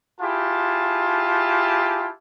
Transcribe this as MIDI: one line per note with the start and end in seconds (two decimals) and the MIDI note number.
0.21 2.09 64
0.21 2.09 65
0.21 2.09 67
0.21 2.09 68
0.21 2.09 81